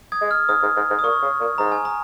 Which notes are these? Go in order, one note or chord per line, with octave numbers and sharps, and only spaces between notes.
D#6 G#6
G#3
F6
G#2 D#6
G#2
G#2
G#2
D#6
A#2 C#6
C#3
A#2
G#2 A#5
G#5
A#5